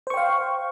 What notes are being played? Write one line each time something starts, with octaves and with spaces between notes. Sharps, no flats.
C5 F5 G5 C#6